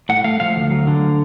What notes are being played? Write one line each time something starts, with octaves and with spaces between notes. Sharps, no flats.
A2 F#5
A3 F5
F3 F5
D2
F#3
D3